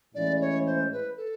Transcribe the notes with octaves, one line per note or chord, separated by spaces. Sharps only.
A2 E3 G#3 C#4 E4 D5
C#5
C5
B4
A4